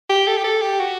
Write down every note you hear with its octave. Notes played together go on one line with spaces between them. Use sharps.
G4
A4
G4
A4
G4
F#4